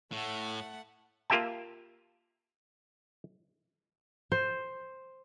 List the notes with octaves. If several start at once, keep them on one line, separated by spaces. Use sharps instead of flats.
A2 A3 F#5
A#3 F4 G4 E5 G5 A5
C5